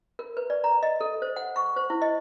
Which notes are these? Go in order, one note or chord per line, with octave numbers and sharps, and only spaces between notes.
A#4
B4
D5
A#5
D#5
A4
C5
F#5
C#6
C5
E4
D#5